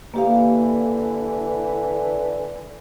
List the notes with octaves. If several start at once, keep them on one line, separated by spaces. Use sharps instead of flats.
D3 E3 A#3 G4 F5